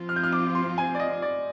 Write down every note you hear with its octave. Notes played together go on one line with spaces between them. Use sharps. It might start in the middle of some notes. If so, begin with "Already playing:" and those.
Already playing: F3 C4 F4
F6
G6
F6
D6
C6
G#5
D5
D#5
D5